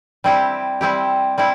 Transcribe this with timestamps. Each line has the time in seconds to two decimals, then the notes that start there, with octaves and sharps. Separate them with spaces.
0.24 G3 C4 E4 G4
0.81 G3 C4 E4 G4
1.38 G3 C4 E4